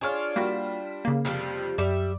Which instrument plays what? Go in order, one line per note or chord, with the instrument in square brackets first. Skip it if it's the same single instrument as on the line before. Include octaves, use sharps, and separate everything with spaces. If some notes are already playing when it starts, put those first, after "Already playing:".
[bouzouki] D4 F4 [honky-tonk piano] G#4 C#5 F6
[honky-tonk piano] G3 [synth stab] A#3 F#4
[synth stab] C#3 A#3
[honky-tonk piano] F2 [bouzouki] C3 F3 G3
[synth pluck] F#2 [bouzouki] G3 E5 [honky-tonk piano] D5